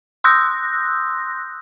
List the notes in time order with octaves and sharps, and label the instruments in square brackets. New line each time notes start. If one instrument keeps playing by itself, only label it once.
[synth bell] C6 D#6 E6 F#6 G6 A#6